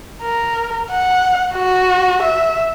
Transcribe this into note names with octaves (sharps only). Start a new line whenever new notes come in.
A#4
F#5
F#4
E5